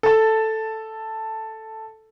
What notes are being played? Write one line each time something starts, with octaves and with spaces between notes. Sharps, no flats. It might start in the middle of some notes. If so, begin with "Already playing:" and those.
A4 A5